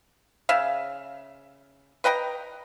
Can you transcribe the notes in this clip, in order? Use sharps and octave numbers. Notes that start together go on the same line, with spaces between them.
C#3 E5 F5
B4 D#5 G5 A#5